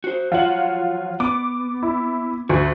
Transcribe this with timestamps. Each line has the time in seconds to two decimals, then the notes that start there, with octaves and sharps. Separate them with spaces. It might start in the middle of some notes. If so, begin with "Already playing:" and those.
0.04 F#4 C5
0.32 F3 F#3 F4 C#5 F#5 F#7
1.20 B3 D6
1.83 E4
2.49 D2 F#4